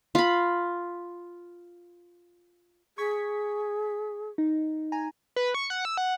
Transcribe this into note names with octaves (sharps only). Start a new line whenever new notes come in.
F4 B5
G#4 C#6 G#6 B6
D#4
G#5 A#5
B4
C#6
F#5
E6
F#5